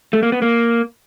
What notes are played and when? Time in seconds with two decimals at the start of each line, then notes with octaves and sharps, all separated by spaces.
0.13 A3
0.23 A#3
0.32 B3
0.42 A#3